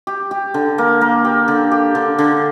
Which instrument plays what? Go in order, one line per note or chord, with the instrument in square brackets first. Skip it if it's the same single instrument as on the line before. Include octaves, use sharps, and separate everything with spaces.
[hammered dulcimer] G4
G4
D3
A#3
A#3
G4
D3
G4
D3
D3